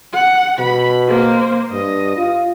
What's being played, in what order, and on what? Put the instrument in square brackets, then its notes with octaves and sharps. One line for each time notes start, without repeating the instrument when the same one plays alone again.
[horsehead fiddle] F#5
[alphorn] B2 [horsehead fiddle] B5
[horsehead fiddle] A#3 C5
[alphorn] G2 [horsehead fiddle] D#5
[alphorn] F4